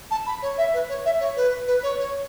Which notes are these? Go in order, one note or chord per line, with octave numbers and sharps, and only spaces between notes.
A5
B5
C#5
E5
B4
C#5
E5
C#5
B4
B4
C#5
C#5